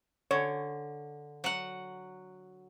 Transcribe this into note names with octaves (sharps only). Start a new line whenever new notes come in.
D3 C#5
F#3 F#5